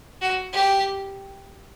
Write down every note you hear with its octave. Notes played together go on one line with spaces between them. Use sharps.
F#4
G4